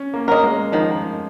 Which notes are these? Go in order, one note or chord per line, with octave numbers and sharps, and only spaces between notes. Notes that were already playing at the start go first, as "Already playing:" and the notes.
Already playing: C#4
A#3
A#4 D#5
G#3
D#3 F3